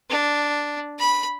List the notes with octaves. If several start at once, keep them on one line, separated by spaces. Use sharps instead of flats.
D4
B5